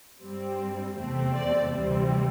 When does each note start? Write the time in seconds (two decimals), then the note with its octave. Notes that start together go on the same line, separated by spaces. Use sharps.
0.22 G2 G3 C4
0.97 E2 C3 A3 C4
1.34 D5
1.71 D2 C3 E3 G3 C4